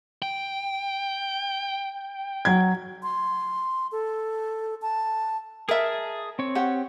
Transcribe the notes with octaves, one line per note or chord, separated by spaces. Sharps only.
G5
F#3 G#6
C6
A4
A5
G#4 A#4 E5 A5
C4 C#5
G4 F#5